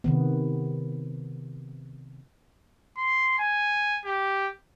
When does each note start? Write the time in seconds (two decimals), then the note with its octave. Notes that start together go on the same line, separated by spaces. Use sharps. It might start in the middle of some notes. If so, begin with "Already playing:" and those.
0.04 C3 D#3 B3
2.98 C6
3.39 G#5
4.05 G4